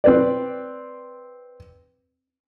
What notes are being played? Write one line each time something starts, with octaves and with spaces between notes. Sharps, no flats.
C4 B4 D5